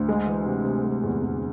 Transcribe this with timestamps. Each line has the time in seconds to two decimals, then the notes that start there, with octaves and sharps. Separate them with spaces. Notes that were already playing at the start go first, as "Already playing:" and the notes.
Already playing: D2
0.09 G#3
0.26 E3
0.46 C3
0.64 C3
0.84 G#3
1.03 E2
1.22 E2